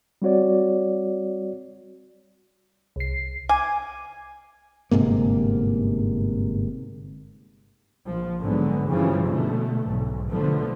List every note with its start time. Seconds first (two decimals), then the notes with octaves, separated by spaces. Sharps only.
0.22 G3 C4 F#4 C#5 D5
2.96 C2 C7
3.49 G#5 D6
4.91 G1 G#2 C3 A#3
8.06 A#1 F3
8.39 G#2 D3 F#3 G#3 B3
8.88 G2 C#3 E3 F3 G3
9.25 B2 D3 A3
9.86 B1 G#2
10.30 B1 D3 F3 A3 B3